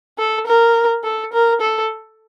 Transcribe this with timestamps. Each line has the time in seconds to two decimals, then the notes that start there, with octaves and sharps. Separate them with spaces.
0.18 A4
0.47 A#4
1.04 A4
1.33 A#4
1.61 A4